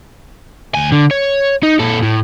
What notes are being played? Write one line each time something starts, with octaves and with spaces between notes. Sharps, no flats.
D2 G#5
D3
C#5
D#4
A#2 A4
A2